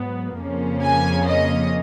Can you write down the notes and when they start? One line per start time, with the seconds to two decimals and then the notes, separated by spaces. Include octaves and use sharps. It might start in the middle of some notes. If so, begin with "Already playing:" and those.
Already playing: G#2 F#3 B3
0.37 F2 C#3 F3 A#3 C#4
0.82 G#5
1.26 D#5